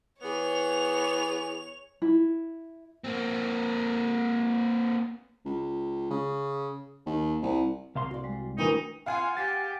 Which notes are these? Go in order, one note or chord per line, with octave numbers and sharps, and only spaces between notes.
E3 B3 G#4 C#5 F7
E4
A#3 C4
C#2
C#3
D#2
C2
C2 F5 C6
F#4 D5
G3 G#3
D2 D#3 E3 D4 D#4 A#4
F4 F5 F#5 G#5
G4 A6 B6